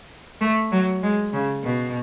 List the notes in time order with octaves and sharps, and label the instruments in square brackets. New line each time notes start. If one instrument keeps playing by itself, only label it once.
[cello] A3
F#3
G#3
C#3
B2